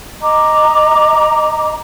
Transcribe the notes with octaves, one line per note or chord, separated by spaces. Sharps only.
D#5 A#5 D6